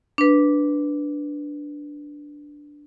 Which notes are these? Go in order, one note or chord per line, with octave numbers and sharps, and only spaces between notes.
D4 B4